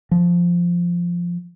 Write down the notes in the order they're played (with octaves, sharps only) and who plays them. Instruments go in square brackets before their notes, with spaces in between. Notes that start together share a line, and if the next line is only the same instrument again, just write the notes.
[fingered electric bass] F3